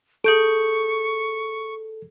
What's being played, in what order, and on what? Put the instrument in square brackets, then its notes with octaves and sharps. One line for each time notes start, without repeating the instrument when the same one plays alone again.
[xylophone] G#4 G6 D7 [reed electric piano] A4 [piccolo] C#6